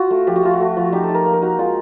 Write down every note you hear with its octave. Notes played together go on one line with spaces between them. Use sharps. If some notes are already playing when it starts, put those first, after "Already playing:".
Already playing: F4 F#4
A3
F3 G4
F#4
A3 F4
F#4
A3
F3
D#4 G4
A4
D#4
A#4
A#3
A#4
D#4 F#4
G#3 F4